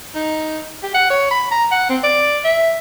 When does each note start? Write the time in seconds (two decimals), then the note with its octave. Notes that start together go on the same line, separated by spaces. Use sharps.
0.15 D#4
0.83 G4
0.94 F#5
1.10 C#5
1.31 B5
1.51 A#5
1.71 F#5
1.89 C4
2.03 D5
2.44 E5